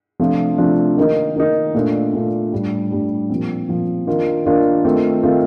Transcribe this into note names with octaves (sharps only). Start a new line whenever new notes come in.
C3 F3 A3 D4 F4
C3 F3 A3 D4 F4
D#3 A#3 D#4
D#3 A#3 D#4
A#2 A3 D4 F4
A#2 A3 D4 F4
A2 G3 D4
A2 G3 D4
A#2 F3 C4
A#2 F3 C4
D#3 A#3 D4 F4
D#3 A#3 D4 F4
D#3 A3 C4 F4
D#3 A3 C4 F4